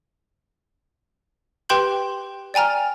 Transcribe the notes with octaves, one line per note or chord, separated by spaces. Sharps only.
G4 B4 G5 C6 G6 F#7
D5 G5 G#5 A#5 F6